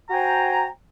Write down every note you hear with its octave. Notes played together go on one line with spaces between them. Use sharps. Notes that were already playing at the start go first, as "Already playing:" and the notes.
F#4 C5 G5 G#5 A#5